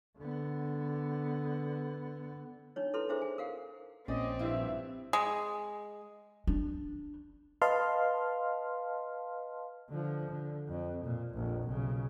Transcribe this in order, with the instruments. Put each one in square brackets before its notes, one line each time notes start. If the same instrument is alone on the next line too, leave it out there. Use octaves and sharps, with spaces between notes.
[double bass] D3 B3
[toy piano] D4 D#4 C#5
E4 A4 B4 C6
D4 E4 G#4 C5 E5
G#5
A#4 F5 F#5
[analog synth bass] A#1 [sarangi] C4 [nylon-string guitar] C#4 [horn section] D5 D#5
[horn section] G2 E5 [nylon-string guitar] E4 F4
[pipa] G#3
[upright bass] D4
[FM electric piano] B4 D#5 F5 A5 C6 F6
[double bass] D3 F3
D3
F2
A#2
A#1 F2
B1 C#3